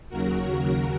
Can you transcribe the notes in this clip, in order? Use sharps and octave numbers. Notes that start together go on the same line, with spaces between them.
D#2 C#3 F#3 F#4 A#4